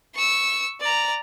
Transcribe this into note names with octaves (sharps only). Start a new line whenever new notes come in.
C#6 E6
D5 A#5